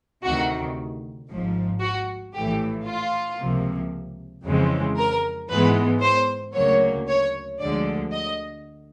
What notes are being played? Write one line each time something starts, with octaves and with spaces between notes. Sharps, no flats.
D2 C3 D#3 F#4
G#1 G#2 F3
F#4
A#1 A2 E3 A3 G4
F4
C#2 C3 F3 A#3
F2 C#3 E3 G#3 C4
A#4
G#2 E3 G#3 B3 B4
C5
D2 C#3 F#3 A#3 C#5
C#5
D2 D3 F3 G#3 D5
D#5